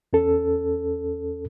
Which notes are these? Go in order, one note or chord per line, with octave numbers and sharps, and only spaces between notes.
E2 C#4 A4